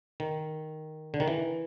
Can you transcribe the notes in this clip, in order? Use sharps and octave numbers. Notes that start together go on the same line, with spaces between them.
D#3
D3
D#3
E3